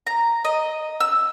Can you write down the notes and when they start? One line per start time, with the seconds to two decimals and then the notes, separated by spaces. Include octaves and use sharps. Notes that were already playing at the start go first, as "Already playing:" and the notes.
0.07 A#5
0.45 D#5
1.00 E6